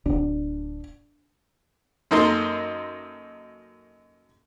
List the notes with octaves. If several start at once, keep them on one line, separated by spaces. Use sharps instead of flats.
D1 G#1 D4
F#2 A#3 D#4 A4 A#4 C6